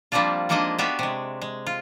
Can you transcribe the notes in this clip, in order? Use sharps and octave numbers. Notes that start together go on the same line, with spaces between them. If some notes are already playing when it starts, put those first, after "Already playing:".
F3 G3 A#3 C4 D4 F4
F3 G#3 A#3 D4 D#4 D#5
B3 D4 F#4 G4 E5 F5
C3 G#3
G#3
F4